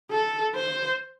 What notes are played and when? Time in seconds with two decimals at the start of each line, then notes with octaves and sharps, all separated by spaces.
0.11 A4
0.55 C5